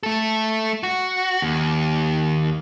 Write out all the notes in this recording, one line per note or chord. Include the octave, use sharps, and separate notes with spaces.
A3 A4
F#4
D#2